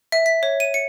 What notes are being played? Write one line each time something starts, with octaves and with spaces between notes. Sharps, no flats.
E5
B6
C#5
D#7
C#7